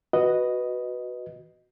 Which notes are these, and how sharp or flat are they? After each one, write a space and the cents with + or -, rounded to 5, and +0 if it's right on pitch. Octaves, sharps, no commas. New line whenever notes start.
F#4 +0 B4 +0 D#5 +0